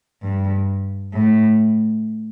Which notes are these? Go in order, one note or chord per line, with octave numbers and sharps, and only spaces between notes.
G2
A2